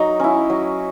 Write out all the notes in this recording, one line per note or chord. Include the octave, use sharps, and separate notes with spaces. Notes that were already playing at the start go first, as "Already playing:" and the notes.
Already playing: F#3 D#4
C#4 E4
F#3